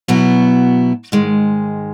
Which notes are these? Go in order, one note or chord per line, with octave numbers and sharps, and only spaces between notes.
B2 F#3 B3 E4
G#2 D#3 G#3